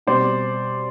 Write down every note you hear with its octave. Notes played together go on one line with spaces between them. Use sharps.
B2 G3 C4 C5 D5